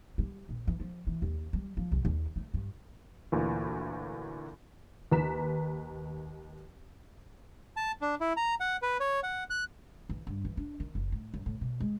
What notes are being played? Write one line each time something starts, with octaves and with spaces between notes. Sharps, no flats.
G3
A#1
E3
F3
E3
D#2
G3
F3
C2
D#2
A3
G2
D2 A#2 E3
D#2 B4 A#5 B6 E7
A5
D4
E4
A#5
F#5
B4
C#5
F#5
F#6
E3
G2
E3
D4
D#3
F#1
A2
F#2
A2
B2
G#3